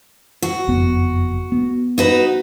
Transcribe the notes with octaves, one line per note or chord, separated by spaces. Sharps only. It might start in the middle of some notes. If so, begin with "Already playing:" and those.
F#4
F#1 F2 B3
B3
D#4 F#4 B4